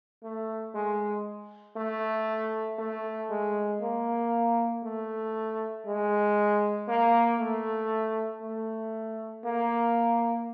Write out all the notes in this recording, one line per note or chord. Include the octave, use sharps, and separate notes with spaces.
A3
G#3
A3
A3
G#3
A#3
A3
G#3
A#3
A3
A3
A#3